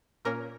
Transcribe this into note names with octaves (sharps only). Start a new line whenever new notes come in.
A#2 A#3 C#4 A#4